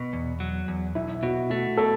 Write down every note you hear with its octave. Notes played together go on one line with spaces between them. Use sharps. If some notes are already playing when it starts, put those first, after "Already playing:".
Already playing: B2
E2
F#3
E2
B1 E4
B2 F#4
A3 F#4
B2 A4